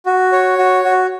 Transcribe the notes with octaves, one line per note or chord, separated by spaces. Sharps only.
F#4
C#5
F#4
F#4